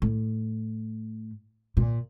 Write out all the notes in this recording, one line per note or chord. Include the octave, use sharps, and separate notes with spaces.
A2
A#2